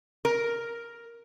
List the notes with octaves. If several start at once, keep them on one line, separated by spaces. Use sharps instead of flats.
A#4